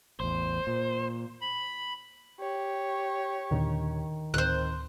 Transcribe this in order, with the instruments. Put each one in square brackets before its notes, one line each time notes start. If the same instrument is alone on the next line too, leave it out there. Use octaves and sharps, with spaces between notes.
[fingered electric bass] A1 E2 [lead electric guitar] C5
[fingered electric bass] A#2
[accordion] B5
[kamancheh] G4 C#5
[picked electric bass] D#2 A#2 D3 [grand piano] D#3
[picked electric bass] D1 [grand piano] D#3 C4 [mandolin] C5 F#6